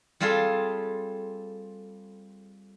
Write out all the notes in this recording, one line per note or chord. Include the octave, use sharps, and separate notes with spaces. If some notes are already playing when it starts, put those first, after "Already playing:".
G3 C4 F4 G#4 A4